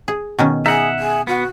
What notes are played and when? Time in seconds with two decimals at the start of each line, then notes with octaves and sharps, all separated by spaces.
0.08 G#4
0.39 B2 D#3 C#4
0.66 D#4 G#4 E5 F#5
0.99 G#4
1.27 B3 F#4